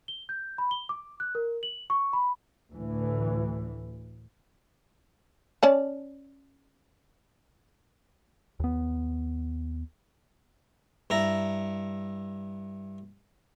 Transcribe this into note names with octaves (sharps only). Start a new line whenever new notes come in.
G7
G6
B5
G7
D6
F#6
A#4
F#7
C#6
B5
D2 A2 E3
C#4 D5 A5
D#2 B3
G2 E4 A#5